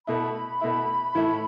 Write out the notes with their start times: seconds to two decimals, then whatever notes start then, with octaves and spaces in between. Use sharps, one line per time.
0.07 B2 A3 E4 B5
0.61 B2 A3 E4
1.15 A2 E3 A3 E4